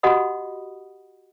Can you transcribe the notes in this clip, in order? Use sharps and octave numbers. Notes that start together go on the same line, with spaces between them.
F#4 G4 D#5 F#5 B5 D#6